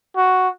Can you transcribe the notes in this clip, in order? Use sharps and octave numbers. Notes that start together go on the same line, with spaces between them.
F#4